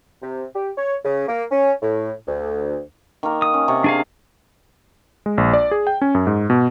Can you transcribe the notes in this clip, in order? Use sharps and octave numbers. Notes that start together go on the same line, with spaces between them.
C3
G4
C#5
C#3
A#3
C#4
A2
D2
D#3 A#3 A#4
D#6
C#4
C3 C#6 D6
D4 G#4 F5
G#3
A#1
D5
G#4
G5
C#4
F#2
G#2
B2